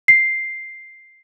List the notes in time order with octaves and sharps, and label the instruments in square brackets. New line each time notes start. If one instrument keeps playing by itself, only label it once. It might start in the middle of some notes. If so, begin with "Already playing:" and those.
[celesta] C7